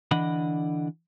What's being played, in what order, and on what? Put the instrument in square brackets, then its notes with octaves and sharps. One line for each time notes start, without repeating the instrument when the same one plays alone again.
[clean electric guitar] D3 E3 D4 D#5 F#5 B5